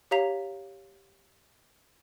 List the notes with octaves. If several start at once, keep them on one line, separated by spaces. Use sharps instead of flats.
G4 C#5 F5 A#5 B6 F7